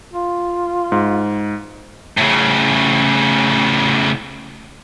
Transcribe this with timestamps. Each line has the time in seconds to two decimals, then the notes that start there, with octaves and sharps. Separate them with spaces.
0.13 F4
0.92 G#2
2.17 A2 C#3